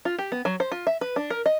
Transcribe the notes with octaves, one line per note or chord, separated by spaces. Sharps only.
F4
G4
B3
F#3
C5
F4
E5
B4
D4
A#4
D#5